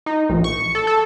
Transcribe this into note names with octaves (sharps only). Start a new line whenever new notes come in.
D#4
A#1
C#6
A4
A4